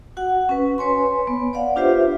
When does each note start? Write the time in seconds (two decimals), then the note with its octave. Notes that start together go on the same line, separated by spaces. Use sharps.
0.17 F#4 F#5
0.49 C#4 B4
0.78 B4 C#5 G#5 C6
1.27 B3
1.53 C#5 D5 F5 F#5
1.76 D4 F4 G4 B4 C5 E5